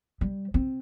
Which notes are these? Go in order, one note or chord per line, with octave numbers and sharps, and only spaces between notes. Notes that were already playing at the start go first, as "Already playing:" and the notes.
G3
C4